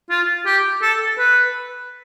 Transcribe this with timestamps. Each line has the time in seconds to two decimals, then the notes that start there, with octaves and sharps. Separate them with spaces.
0.10 F4
0.46 G4
0.82 A4
1.18 B4